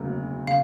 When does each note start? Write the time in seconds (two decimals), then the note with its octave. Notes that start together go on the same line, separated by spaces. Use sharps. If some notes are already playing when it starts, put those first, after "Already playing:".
Already playing: E1 D2 C#3 F#3 A#3
0.47 C#3 F5